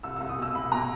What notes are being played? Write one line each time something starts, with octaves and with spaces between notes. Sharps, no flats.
C2 E6
E6
C2
D#6
B2 E6
C2 B5
B2 A#5